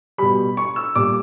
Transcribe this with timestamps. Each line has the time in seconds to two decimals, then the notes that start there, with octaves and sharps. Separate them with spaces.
0.18 B2 G3 B5
0.57 C#6
0.76 E6
0.95 A#2 G3 D6